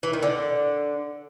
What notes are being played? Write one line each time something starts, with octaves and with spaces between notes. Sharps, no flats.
E3
D#3
D3